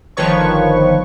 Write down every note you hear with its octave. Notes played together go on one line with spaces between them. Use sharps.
G1 D#3 F3 B4 C#5 C#6